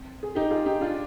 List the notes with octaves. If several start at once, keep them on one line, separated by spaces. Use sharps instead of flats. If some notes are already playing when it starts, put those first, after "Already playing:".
Already playing: C4
G#4
D#4 G4
F4 G#4
D#4 G4
D4 F4